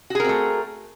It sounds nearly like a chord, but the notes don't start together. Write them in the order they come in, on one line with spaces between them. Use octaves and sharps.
F#4 G#4 A#4 C4 A3